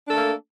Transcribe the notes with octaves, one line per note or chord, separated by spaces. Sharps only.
A3 A#3 D4 A4